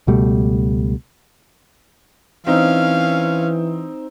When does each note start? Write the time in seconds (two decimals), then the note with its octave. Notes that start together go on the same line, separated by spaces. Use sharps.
0.07 C#2 B2 G3 A3
2.47 E3 C4 C#4 D#4 F5